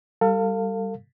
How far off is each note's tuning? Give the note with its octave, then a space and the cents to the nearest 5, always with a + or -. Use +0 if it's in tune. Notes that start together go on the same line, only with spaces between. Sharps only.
G3 +0 A4 +40 F5 +0